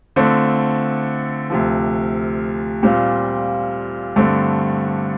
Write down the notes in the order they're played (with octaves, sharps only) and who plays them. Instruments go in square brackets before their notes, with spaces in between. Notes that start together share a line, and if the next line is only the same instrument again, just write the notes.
[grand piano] D3 A3 C4 F4
D2 C3 F3
A#2 G3 C4 F4
G2 D3 A3 C4